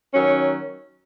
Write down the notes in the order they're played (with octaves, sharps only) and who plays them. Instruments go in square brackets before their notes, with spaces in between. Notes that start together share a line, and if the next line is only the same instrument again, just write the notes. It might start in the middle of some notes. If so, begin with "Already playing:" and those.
[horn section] D#3 F#3 C#4